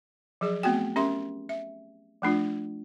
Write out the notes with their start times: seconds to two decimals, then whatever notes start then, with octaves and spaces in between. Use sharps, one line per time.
0.41 F3 F#3 G#4 D5
0.63 A3 B3 C4 F#4 G5
0.96 C#4 G4 A#4 E5 C6
1.49 E5
2.22 F3 A3 D4 F4